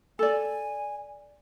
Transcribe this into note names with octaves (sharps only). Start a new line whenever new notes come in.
A4 D5 G#5